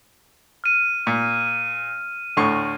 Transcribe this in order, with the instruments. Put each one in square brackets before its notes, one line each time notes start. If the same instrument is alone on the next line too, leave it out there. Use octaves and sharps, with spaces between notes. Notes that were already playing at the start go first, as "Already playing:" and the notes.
[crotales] F6 D#7
[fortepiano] A#2
D2 A2 C#6